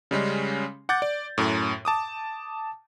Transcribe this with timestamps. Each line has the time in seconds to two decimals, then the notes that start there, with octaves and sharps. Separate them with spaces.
0.11 C#3 G3 G#3 C#4
0.89 F#5 D6 G6 A6
1.02 D5
1.38 F#2 A2
1.85 A5 D6 D#6